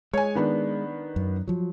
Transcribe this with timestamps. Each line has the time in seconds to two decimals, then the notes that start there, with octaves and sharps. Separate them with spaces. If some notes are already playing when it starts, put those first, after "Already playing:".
0.14 G#3 C#5 G#5
0.35 D#3 B3 D4
1.16 F#2
1.48 F3 F#3